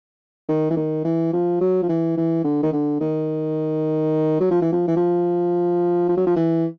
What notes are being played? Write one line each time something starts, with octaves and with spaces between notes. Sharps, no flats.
D#3
E3
D#3
E3
F3
F#3
F3
E3
E3
D3
D#3
D3
D#3
F#3
F3
E3
F3
E3
F3
F3
F#3
F3
E3